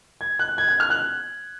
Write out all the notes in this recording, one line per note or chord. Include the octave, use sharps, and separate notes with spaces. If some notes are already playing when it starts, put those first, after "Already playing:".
G#6
F#6
G#6
F#6
F6
F#6